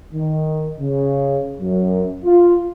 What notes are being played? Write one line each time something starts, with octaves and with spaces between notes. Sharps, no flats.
D#3
C#3
F#2
F4